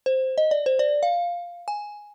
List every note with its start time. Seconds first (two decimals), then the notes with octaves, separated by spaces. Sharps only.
0.06 C5
0.38 D#5
0.51 D5
0.66 C5
0.79 D5
1.03 F5
1.68 G#5